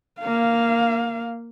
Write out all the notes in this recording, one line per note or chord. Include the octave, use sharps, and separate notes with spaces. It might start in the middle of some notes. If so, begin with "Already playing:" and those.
A#3 F5